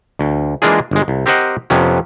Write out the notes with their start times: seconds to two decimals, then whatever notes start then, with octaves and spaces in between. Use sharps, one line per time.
0.19 D2
0.62 E3 G#3 A#3 D4 F4 G#4
0.91 G1 G#3
1.08 C2
1.26 C4 G4 A#4 C5 D#5 F#5
1.70 F2 C3 B3 C#4